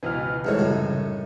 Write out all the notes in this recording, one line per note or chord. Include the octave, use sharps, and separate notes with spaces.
C#2 B2 E3 B4 F6
C2 G#2 E3 D#4 A4 C#5
C2 F#2 A2 C#3